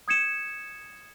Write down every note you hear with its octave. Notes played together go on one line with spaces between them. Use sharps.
D#6 G#6 C#7 E7